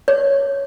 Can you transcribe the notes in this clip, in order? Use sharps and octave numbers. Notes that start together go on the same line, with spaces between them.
C#5